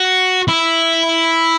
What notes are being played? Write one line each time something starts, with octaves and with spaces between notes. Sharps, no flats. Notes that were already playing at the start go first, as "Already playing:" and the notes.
Already playing: F#4
E4